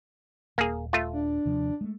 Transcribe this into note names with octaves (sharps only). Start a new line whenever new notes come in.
D#1 A#3 G#4
A3 F4
D4
D#2 C3 F3
G#3 A3